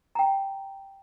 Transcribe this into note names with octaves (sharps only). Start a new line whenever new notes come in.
G5 A#5